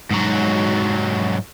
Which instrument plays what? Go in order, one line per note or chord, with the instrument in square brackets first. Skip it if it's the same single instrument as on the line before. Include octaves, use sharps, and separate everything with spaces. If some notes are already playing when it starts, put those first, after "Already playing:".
[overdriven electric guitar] G#2 F#3